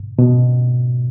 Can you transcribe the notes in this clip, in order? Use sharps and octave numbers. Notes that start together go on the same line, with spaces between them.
B2